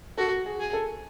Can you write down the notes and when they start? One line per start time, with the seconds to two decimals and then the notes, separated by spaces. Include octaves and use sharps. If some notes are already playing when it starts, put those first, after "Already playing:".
0.17 F#4 A4
0.46 G#4
0.60 G#4
0.73 A4